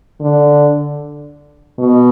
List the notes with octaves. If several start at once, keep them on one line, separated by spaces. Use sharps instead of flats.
D3
B2